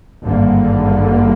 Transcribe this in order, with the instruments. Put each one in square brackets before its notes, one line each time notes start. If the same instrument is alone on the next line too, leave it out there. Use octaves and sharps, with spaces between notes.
[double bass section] G#1 G2 D3 G3 A#3